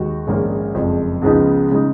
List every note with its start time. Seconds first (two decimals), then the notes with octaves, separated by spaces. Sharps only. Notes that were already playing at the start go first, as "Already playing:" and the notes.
Already playing: D#2 D#3 G#3 D#4 F#4
0.27 A#1 G#2 D#3 A#3 C#4
0.75 F#1 F2 F3 G#3
1.22 C#2 C#3 F3 B3 D#4
1.71 C#3 G#3 D#4